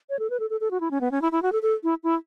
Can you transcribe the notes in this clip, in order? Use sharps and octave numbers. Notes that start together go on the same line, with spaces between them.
C#5
A4
B4
A4
A4
A4
F#4
E4
C#4
B3
C#4
E4
E4
F#4
A4
A4
E4
E4